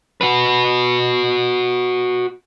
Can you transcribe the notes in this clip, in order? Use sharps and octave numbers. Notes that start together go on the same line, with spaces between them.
F#4 B4